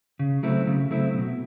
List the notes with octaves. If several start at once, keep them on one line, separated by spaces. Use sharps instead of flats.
C#3
F#3 A3 C4 E4
C#3
F#3 A3 C4 E4
B2